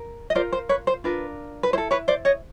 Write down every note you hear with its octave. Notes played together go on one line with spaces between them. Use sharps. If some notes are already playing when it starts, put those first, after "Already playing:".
Already playing: A#4
D#5
F4 A#4 C5 D5
C5
B4 C#5
C5
D4 F4 A#4 B4
B4
E4 A4 C5
B4 C#5
C5 D5
C#5 D#5